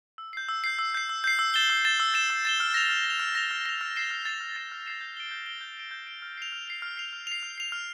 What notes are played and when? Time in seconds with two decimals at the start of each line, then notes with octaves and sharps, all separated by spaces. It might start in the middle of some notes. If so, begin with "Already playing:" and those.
0.18 E6
0.33 G6 C7
0.49 E6
0.64 G6 C7
0.79 E6
0.94 G6 C7
1.09 E6
1.24 G6 C7
1.39 E6
1.54 A6 E7 G7
1.70 E6
1.85 A6 E7 G7
2.00 E6
2.14 A6 E7 G7
2.30 E6
2.45 A6 E7 G7
2.60 F6
2.74 A#6 F7
2.89 F6
3.04 A#6
3.10 F7
3.20 F6
3.35 A#6 F7
3.51 F6
3.66 A#6 F7
3.81 F6
3.96 A6 C7 E7
4.11 F6
4.25 A6 C7 E7
4.41 F6
4.56 A6 C7 E7
4.72 F6
4.86 A6 C7 E7
5.01 G6
5.17 D7 G7
5.31 G6
5.46 D7 G7
5.61 G6
5.77 D7 G7
5.91 G6
6.07 D7 G7
6.22 F6
6.37 C7 F7
6.52 F6
6.68 C7 F7
6.82 F6
6.97 C7 F7
7.13 F6
7.27 C7 F7
7.43 F6
7.58 C7 F7
7.72 F6